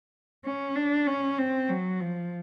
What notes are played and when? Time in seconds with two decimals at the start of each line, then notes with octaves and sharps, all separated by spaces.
0.45 C#4
0.76 D4
1.07 C#4
1.39 C4
1.69 F#3
2.00 F3